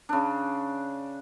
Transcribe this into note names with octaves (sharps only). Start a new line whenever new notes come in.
C#3 D4